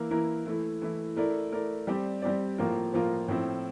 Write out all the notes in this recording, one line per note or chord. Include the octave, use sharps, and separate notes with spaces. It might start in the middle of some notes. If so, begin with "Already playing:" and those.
Already playing: E3 A#3 E4 A#4
E3 A#3 E4 A#4
E3 A3 E4
E3 A3 E4
A3 E4 A#4 D5
A3 E4 A#4 D5
G3 C4 G4 D5
G3 C4 G4 D5
A2 F3 A#3 F4 A#4
A2 F3 A#3 F4 A#4
A2 F3 C4 E4